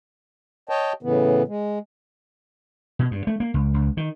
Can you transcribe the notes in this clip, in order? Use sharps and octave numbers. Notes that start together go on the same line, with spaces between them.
C#5 D#5 G5 A5
A2 C#3 E3 B3
G#3
B2
G2
A3
A#3
C#2
C#2
D#3